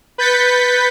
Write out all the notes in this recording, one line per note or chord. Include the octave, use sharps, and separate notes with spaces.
B4 G6 A6 B6 C#7